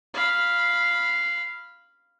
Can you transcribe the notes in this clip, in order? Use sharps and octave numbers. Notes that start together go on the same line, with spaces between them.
F5 B5